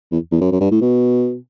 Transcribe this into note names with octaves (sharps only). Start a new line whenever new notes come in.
E2
E2
F#2
F#2
G2
A2
B2